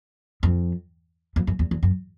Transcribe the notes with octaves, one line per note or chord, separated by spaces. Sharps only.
F2
F2
F#2
E2
E2
F#2